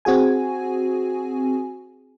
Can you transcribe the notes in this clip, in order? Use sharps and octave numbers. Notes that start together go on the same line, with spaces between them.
C4 F#4 G#4 G#5